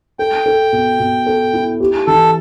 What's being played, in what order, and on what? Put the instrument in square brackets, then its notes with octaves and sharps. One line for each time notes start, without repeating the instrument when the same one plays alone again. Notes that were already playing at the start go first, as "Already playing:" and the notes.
[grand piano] A4 [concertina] G5
[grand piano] A4
B2
B2
A4
E4
G4
[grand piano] E3 [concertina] A4